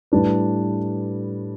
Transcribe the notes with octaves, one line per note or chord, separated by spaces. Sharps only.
A2 G3 D4 B4